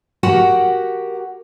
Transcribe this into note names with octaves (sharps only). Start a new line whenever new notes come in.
F#4 G4 A#4 F#5 G5